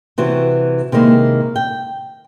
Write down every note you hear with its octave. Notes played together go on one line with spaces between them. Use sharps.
C3 E3 F#4
C3 D#3 G#3 A#3 E4
G5